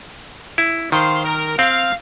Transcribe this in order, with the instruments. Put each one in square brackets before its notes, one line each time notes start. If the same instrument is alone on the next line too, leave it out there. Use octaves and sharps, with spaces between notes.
[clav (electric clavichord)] E4
[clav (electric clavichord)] D#3 [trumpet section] C5 F5 C6
[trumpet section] A#4
[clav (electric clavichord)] C4 [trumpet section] F5